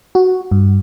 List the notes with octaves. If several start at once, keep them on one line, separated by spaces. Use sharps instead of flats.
F#4
G2